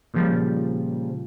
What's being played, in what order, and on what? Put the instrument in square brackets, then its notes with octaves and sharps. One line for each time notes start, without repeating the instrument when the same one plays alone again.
[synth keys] A#2 C#3 F3 G3